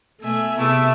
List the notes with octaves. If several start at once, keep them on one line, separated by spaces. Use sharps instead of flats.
B2 A3 E5 G#5
C3 A3 B3 E4 G#4 E5 D6 E6